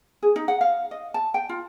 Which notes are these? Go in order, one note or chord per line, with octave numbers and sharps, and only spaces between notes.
G#4
D#4
F#5
F5
D#5
A5
G5
F4